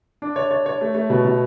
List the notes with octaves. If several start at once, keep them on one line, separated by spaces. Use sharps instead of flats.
D4
C#5
C#5
C#5
A3
A3
B2
B2